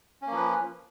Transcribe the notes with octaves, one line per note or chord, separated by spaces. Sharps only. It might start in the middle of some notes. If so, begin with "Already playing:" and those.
F3 A#3 C#4 B4